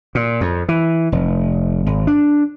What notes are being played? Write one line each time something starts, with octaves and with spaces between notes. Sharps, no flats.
A#2
F2
E3
F1
G#1
D4